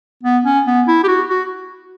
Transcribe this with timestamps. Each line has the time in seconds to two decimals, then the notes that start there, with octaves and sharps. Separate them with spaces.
0.23 B3
0.45 C#4
0.67 B3
0.88 E4
1.04 G4
1.08 F#4
1.29 F#4